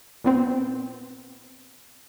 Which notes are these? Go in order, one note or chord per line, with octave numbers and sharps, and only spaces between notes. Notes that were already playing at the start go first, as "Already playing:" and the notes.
A#2 B3 C4